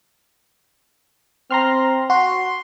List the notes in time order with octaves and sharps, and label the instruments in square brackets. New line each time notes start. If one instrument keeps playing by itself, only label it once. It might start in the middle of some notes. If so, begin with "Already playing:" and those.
[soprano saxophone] C4 [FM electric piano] A#5 C6 F6
[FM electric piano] F#4 [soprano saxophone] C6